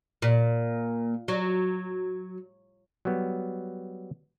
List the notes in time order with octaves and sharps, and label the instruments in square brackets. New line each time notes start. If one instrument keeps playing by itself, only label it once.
[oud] A#2
F#3
[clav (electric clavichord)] F#3 G3 B3